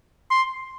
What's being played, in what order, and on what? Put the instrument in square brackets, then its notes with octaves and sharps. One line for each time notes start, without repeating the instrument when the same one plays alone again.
[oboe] C6